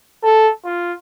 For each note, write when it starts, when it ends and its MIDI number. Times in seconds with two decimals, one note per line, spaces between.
0.24 0.50 69
0.65 0.93 65